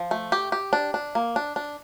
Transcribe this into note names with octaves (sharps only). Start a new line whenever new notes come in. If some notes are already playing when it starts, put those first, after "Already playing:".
Already playing: F3
A3
G4
G4
D4
D4
A#3
D4
D4